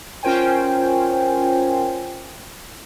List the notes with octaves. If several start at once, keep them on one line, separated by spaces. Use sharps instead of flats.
C#4 F4 A#4 C5 G5 G#5